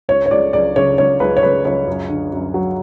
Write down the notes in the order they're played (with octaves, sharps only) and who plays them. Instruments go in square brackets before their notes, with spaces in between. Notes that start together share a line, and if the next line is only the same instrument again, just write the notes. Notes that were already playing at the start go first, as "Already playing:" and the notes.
[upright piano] C#2 C#5
C#5
C#2 D5
C#2 D5
C#3 C#5
C#2 C#5
C#2 B4
C#5
C#2 B4
C#2 C#5
F#2
D3
F#2
F#3